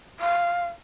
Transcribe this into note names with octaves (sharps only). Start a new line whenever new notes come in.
F5